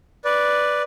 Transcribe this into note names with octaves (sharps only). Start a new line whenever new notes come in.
B4 D5